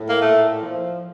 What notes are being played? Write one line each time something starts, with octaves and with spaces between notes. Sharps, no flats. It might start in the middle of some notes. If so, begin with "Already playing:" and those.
Already playing: A2
A#3
A#2 A3
F3